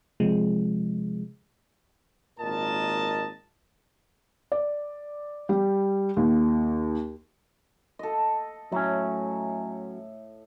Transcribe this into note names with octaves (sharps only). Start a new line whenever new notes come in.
C3 F3 G#3
G#1 A#2 A#4 D#5 A5
D5
G3
D#2
A4 D#5
A2 F#3 C#4